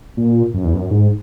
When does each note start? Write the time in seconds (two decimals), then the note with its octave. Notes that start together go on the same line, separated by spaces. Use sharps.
0.17 A#2
0.54 F#2
0.64 E2
0.74 F#2
0.91 G#2